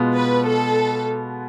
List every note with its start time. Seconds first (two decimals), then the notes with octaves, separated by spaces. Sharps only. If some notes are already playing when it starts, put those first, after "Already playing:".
Already playing: B2 G#3 B3 F4
0.16 B4
0.47 A4